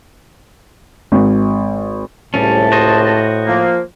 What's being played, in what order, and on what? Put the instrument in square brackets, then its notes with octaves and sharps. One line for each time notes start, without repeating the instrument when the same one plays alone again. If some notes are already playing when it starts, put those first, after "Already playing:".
[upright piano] G#1
[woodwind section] C#2 C3 A5 [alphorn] A2 [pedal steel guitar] G3 C#4
[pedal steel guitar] F#4 C5 D#5
[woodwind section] F3 A#3